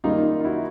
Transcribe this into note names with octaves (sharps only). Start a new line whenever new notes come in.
F#2 D#3 G3 A#3 D#4 F4
F4
E4 F#4